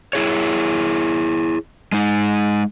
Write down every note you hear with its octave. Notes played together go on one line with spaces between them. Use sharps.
E4 G#4 C#5
G#3 D#4